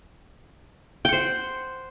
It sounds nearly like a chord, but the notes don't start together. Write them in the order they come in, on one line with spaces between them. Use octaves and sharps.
G5 F#5 C5